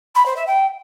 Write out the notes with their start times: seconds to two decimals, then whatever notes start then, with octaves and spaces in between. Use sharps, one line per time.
0.15 B5
0.25 C5
0.36 E5
0.47 G5